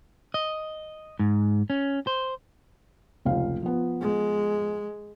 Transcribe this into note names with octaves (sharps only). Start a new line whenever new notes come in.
D#5
G#2
C#4
C5
F1 C#2 F5
F3 B3
G#3